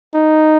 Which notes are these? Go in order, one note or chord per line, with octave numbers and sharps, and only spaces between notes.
D#4